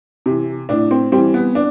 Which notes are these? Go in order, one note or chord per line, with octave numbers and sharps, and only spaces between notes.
C3 E3
A2 D4
C4
E3 G3 C4
B3
D4